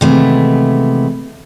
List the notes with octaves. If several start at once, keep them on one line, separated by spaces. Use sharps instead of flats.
C3 D#3 E3 G#3 A3 B3